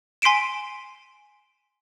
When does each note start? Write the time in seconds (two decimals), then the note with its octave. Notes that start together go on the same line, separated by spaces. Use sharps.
0.22 G#5 C6 B6 C7 D7 E7